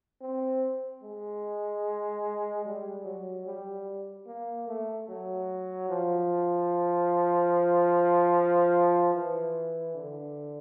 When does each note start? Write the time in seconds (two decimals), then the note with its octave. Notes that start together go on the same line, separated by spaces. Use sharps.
0.21 C4
1.02 G#3
2.65 G3
3.04 F#3
3.46 G3
4.26 A#3
4.68 A3
5.08 F#3
5.89 F3
9.14 E3
9.95 D3